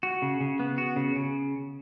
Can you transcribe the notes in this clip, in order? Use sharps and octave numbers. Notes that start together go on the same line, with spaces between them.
F#4
C#3
C#3
B3
F#4
C#3
C#3